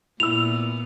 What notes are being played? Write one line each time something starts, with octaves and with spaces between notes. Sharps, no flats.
A#2 B3 E4 E6 F7